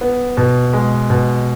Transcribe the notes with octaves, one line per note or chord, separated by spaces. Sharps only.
B3
B2
G#3
B2